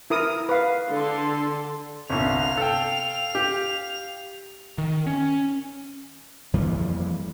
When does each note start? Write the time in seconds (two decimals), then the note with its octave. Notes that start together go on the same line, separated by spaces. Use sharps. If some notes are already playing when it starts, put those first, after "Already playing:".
0.10 E4 A#4 D#6
0.49 B4 F5
0.90 D3 A4 C6
2.10 G1 C2 F5 F7
2.57 A4 G5
3.35 G4
4.78 D#3
5.07 C#4
6.53 F2 E3 G3 A#3